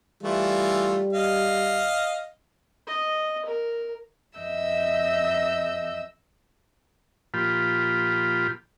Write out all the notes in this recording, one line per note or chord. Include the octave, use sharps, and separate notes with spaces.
E3 G3 A3 F4
D#5 F5
D#5
A#4
F2 D#5 E5 E6 G6
A#2 F3 F4 G4 B5